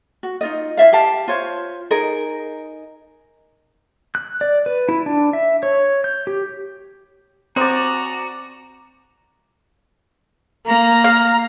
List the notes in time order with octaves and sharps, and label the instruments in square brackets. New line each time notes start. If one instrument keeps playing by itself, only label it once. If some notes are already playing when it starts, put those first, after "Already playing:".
[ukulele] F#4
D#4 F4 D#5
E4 D5 E5 F5
G4 F5 A5
F4 C5 C#5
D#4 G#4 A#4 D#5
[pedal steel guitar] F#6
D5
B4
E4
D4
E5
C#5
G6
G4
[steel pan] C4 C5 [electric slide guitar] F#4 [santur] D5 D#6 [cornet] A#5
[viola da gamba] A#3 [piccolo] A#5
[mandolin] F5